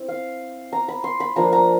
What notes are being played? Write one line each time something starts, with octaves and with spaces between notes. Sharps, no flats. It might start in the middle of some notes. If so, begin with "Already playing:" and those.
Already playing: C4 E4
F5
A#5
B5
C6
B5
F3 A#3 D4 A#5
A#5